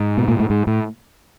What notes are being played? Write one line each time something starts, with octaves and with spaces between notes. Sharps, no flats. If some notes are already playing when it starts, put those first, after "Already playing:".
Already playing: G#2
B2
A#2
A2
G#2
A2